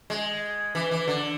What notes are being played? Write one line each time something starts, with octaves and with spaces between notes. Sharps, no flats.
G#3
E3
E3
D3